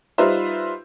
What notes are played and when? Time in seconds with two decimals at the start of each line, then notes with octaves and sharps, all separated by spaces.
0.18 G3 D#4 F4 B4 C5 E5